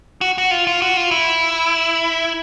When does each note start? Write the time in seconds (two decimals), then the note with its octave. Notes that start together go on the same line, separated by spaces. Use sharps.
0.21 F#4
0.38 F#4
0.51 F4
0.67 F4
0.82 F#4
0.97 F4
1.11 E4